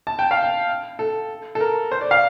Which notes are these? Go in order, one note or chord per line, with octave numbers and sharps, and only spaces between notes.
A5
G5
F5
G5
A4
A4
A#4
C5
D5
F5